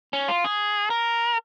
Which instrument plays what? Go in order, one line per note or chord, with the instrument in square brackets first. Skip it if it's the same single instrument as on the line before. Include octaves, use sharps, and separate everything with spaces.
[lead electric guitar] C#4
F4
G#4
A#4